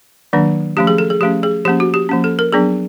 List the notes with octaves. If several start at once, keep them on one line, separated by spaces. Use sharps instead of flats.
D#3 F#3 A#3 D4
F3 A3 C#4 G4
G#4
A4
G#4
F3 A3 C#4 G4
G#4
F3 A#3 C#4 G4
F#4
G4
F3 A#3 C#4
A4
A#4
F#3 B3 D4 G#4